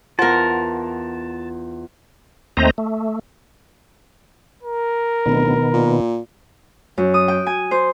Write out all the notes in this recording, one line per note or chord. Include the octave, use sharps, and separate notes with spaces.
E2 F4 A#4 C5 F#5 A5
D#2 A3 C4 C5 D#5 A#5
A3
A#4
D1 B2 D#3 B3
A#2
F#2
D#6
G5
G#5
C5